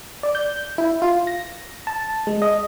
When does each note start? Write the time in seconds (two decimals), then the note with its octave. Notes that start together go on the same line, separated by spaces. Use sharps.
0.23 D5
0.35 G6
0.78 E4
1.02 F4
1.27 A#6
1.87 A5
2.27 G#3
2.42 D#5